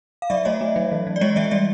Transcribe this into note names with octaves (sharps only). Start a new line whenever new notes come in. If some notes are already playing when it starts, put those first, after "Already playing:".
F5
F#3 D5 E5
A3 C#5 D#5
A3
F#3
E3
E3
D5
G#3 C#5 D#5
E3 D5 E5
G3 D5 E5